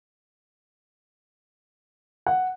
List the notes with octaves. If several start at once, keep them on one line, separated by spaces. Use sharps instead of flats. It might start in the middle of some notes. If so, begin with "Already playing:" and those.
F#5